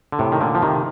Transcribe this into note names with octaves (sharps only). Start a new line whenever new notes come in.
D3
A2 C3
D#3
A#2 D3
F3
C3 D#3